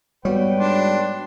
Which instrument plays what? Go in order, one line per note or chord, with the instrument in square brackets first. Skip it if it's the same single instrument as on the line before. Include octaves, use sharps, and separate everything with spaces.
[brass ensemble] G#2 B4 G5 [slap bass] G3 [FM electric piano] B3 F#4 C#5
[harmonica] D4 C6